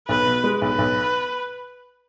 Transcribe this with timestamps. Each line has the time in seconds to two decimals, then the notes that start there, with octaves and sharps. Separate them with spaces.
0.08 B1 B4
0.26 B2
0.44 G#3
0.62 B1 B4
0.79 B1